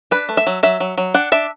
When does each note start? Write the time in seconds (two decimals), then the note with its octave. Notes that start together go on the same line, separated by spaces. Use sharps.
0.11 D4 B4
0.29 A3
0.37 E5
0.47 F#3
0.63 F#3 E5
0.80 F#3
0.98 F#3
1.14 D4 F#5
1.32 D4 E5